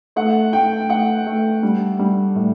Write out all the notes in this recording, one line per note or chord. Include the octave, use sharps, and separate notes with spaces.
A3 F#5
A3 G5
A3 F#5
A3
G3
G3
A2